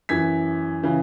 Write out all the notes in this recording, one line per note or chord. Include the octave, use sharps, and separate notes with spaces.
F#2 E3 G#6 B6
C#3 E3